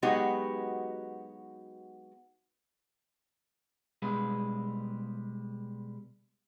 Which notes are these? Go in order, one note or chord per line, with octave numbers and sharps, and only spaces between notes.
F#3 G#3 B3 D#4 F#4 G4
B2 G3 G#3 B4